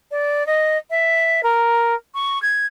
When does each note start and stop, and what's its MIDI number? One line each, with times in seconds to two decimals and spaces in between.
0.11 0.45 74
0.46 0.77 75
0.90 1.41 76
1.43 1.94 70
2.14 2.41 85
2.42 2.66 92